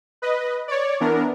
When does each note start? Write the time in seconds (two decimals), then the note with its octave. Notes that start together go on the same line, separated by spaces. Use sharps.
0.22 B4 D#5
0.68 C#5 D5
1.00 E3 B3 D4 A#4